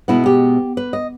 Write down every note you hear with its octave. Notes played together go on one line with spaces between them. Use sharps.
B2 G#3 B3 E4
G4
B4
D#5